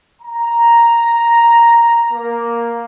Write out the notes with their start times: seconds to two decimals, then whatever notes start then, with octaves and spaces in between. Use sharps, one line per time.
0.22 A#5
2.12 A#3